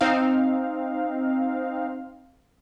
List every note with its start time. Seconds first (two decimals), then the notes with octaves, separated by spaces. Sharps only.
0.01 C4 D#4 F5